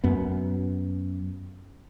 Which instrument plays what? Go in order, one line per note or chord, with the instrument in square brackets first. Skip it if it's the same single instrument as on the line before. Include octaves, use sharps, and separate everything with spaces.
[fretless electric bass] F#2 B3